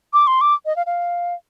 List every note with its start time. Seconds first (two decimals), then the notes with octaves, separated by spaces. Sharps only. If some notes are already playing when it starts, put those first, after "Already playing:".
0.13 D6
0.27 C6
0.41 D6
0.66 D#5
0.76 F5
0.86 F5